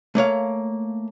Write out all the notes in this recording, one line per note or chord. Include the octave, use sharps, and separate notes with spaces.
A3 A#3 C#5 F5